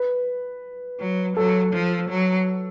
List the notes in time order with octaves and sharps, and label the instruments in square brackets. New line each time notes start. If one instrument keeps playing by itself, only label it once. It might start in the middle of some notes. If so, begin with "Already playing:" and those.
Already playing: [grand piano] B4
[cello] F#3
[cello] F#3 [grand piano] A4
[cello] F3
F#3